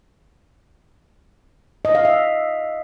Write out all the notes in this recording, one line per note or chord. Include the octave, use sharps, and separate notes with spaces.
D#5
F5
E5